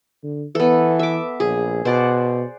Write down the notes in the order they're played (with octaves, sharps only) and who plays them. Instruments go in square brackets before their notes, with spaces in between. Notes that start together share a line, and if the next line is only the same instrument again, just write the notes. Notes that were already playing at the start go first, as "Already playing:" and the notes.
[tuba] D3
[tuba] E3 [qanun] B3 A4
[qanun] E5 D6
[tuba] A#1 [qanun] G#4
[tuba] B2 [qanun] C5 D5 F#5